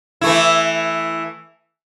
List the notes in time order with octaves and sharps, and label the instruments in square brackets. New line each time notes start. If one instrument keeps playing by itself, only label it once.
[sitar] E3 A3 E4